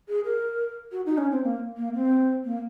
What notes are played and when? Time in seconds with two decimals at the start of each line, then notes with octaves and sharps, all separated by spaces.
0.08 G#4
0.25 A#4
0.92 F#4
1.06 D#4
1.18 C#4
1.31 C4
1.44 A#3
1.77 A#3
1.94 C4
2.45 A#3